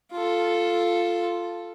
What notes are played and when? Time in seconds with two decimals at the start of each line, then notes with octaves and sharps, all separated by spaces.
0.12 F4 A4